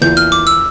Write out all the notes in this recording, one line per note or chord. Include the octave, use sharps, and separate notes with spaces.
E2 E3 A#3 F4 A#4 G6
F6
D6
E6